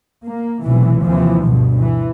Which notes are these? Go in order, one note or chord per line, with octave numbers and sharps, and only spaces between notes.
A#3
F1 B1 B2 E3
D#2 C3 E3 F3
D2 G2 B2
E3